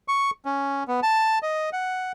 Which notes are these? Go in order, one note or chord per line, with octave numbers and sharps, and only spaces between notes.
C#6
C#4
B3
A5
D#5
F#5